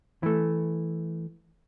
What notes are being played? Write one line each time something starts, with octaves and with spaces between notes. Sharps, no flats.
E3 A3